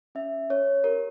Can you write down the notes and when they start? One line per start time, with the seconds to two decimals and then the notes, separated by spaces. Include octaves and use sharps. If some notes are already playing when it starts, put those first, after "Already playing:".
0.15 C#4 E5
0.50 C#4 C#5
0.84 G4 A#4